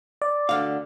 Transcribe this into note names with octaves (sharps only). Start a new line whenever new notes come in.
D5
D2 D3 F5